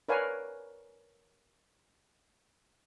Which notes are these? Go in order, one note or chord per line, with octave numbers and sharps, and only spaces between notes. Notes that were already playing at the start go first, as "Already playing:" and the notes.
A#4 B4 C#5 D5 F5 G#5